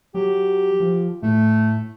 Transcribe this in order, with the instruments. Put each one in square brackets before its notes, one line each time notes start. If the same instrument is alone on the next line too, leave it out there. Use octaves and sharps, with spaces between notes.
[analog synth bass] F#3 [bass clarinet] G4
[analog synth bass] F3
[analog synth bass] A2 [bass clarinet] A3